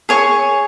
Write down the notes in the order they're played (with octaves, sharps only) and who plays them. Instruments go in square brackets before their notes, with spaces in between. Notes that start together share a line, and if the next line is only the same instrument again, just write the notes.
[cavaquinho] G#4 C#5 G#5 C#6